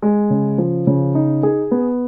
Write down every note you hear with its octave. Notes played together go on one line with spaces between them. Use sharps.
G#3
C#3
F3
C#3
D#4
G#4
B3